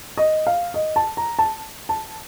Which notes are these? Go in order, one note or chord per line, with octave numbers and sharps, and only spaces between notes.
D#5
F5
D#5
A5
A#5
A5
A5